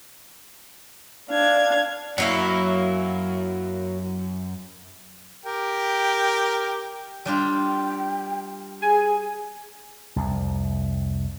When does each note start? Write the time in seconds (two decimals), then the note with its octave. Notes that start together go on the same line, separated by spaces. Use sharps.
1.29 D4 F5 G#6
2.18 F#2 F#3 A#3 E4
5.45 G4 A#4 G5
7.25 G3 D4 F4 G5
8.82 G#4 G#5
10.16 C2 F2